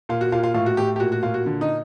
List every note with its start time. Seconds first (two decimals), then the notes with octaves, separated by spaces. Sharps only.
0.09 A#2 F4
0.21 F#4
0.32 A#2 F4
0.44 F4
0.54 A2 F4
0.66 F#4
0.77 A2 G4
0.96 G4
1.00 A#2 F#4
1.12 F#4
1.23 A#2 F4
1.34 F#4
1.46 D3
1.61 D#4